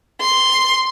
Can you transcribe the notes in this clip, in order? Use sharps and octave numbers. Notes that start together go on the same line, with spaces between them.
C6